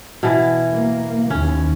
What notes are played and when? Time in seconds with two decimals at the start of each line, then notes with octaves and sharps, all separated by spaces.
0.23 B2 E3
0.71 A#3
1.30 D#2 C#4